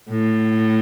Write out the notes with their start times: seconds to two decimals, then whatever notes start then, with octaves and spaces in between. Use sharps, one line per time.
0.10 A2